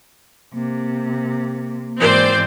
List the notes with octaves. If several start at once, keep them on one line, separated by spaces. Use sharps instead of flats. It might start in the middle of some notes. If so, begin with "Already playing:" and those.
C3 A#3
G#2 E3 C4 C5 D5